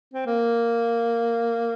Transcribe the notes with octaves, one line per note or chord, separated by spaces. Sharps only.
C4
A#3